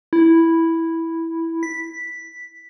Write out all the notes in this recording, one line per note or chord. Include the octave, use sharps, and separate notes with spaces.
E4
B6